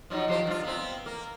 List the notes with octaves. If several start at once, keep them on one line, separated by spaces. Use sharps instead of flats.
F3 F#3 D#4
F3 G4 C5
G2 F4
B3 C4
A#3